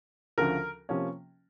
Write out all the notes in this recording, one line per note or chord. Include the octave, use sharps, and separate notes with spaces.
D2 C#3 F3 A#4
C3 F3 A#3 C#4